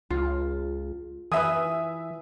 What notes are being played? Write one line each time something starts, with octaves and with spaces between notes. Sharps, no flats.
C#2 F4
E3 B4 E5 G#5 D#6